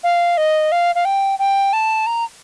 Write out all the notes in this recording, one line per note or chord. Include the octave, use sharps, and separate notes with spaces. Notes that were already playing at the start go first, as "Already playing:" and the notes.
F5
D#5
F5
F5
G5
G5
A5
A#5